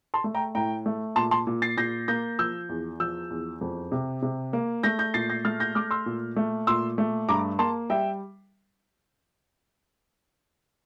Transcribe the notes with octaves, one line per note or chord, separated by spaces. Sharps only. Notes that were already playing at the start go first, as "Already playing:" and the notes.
A5 C6
A3
G5 A#5
A2 G5 A#5
A3
A#2 A5 C6
A5 C6
A#2
A6 C7
A#2 G6 A#6
A#3 G6 A#6
F3 E6 G6
E2
F3 E6 G6
E2
F2
C3
C3
A#3
A3 G6 A#6
G6 A#6
A#2 A6 C7
G6 A#6
A3 F6 A6
G6 A#6
A3 D6 F6
C6 E6
A#2
A3
A#2 C6 E6
A3
G2 A#5 D6
A#3 A5 C6
G3 E5 G5